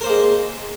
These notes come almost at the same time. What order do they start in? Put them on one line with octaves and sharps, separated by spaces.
A#4 C5 A#3 G#3